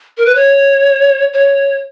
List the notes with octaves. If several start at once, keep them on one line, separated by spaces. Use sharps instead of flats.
A#4
B4
C#5
C#5